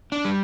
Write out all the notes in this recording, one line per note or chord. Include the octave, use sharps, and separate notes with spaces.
D4
G3